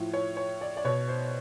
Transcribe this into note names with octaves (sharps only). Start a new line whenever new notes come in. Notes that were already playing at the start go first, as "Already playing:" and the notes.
Already playing: A2 F3
C#5
C#5
D5
D5
B2 C#5
C5